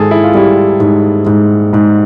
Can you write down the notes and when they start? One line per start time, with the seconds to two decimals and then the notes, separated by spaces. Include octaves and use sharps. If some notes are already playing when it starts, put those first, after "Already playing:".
Already playing: G#2 D#3 G#4 A4
0.11 E4
0.24 F4
0.34 G3 E4
0.80 G#2
1.26 G#2
1.73 G#2